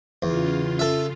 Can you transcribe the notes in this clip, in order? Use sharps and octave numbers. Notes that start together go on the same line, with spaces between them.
E2 C#3 F4
A4 E5